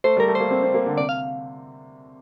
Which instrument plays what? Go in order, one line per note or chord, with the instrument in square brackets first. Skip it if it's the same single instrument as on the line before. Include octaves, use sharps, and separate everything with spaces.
[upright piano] A3 [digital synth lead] C5
[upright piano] G3 [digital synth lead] A#4
[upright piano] A3
[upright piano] A#3 [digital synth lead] C5
[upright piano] C4
C4
A#3
D3
[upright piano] C3 [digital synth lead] D5
[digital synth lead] F5